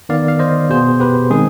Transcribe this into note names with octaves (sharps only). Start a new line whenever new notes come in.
D#3 B3 D5 F5
F5
C5 D#5
B2 B3 G#4 C5
G4 B4
D#3 G#3 C4 G#4